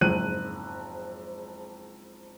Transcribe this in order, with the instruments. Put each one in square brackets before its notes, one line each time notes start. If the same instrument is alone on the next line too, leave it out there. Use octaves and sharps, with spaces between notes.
[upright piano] F#1 F2 G#2 F#6 D#7